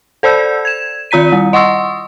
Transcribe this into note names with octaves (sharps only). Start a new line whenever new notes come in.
A4 C5 D5 E6 G6
G#6 E7
D#3 F4 A#5 B6 D#7
G3
D#5 F#5 C6 C#6 D#6 E6